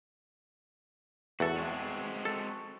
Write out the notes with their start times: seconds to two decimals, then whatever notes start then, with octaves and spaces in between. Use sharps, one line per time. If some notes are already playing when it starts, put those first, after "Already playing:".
1.40 E2 F#4 A4
1.56 G#3 C4 F#4
2.25 A4